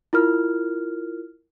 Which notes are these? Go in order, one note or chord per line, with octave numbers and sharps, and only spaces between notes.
E4 F4 A#4 F6